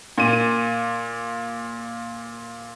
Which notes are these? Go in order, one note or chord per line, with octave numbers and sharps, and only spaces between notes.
A#2 D#7